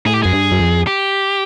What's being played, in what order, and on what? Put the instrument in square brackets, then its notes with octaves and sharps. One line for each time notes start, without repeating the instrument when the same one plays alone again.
[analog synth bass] A2 [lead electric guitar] G#4
[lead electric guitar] G4
[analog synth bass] F#2 [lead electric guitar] G#4
[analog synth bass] G2
F#2
F2
[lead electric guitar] G4